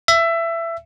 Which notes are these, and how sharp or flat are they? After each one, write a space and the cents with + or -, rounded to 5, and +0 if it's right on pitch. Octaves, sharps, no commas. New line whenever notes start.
E5 +20